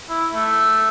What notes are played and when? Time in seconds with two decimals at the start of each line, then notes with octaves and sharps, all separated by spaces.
0.10 E4
0.34 A3